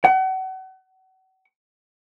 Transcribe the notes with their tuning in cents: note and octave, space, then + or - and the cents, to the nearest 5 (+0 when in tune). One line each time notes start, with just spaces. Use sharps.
F#5 +35